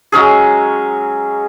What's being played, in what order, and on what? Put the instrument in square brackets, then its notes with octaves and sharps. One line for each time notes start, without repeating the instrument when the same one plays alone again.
[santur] F#3 G#3 C#4 G#4